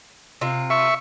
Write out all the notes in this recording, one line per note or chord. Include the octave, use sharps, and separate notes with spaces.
C3 F4
E5 C#6